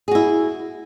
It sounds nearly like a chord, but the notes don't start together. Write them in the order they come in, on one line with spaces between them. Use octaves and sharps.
G#4 F#4 E4